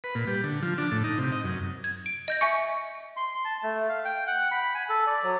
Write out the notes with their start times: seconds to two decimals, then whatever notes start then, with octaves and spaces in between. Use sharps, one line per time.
0.04 B4
0.15 A#2
0.27 G3
0.44 D3
0.63 F3
0.78 D4
0.92 A2
1.04 D#4
1.18 C3
1.32 D#5
1.44 F#2
1.84 G#6
2.06 D7
2.28 D#5 G6 A#6
2.41 E5 G#5 C#6 C#7
3.17 C6
3.45 A5
3.63 A3
3.89 F5
4.05 G5
4.27 F#5
4.51 B5
4.75 G#5
4.89 A4
5.07 D5
5.24 F#3